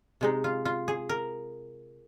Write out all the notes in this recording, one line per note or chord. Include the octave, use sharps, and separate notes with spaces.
C3 G#3 D#4
F4
F4
G#4
A#4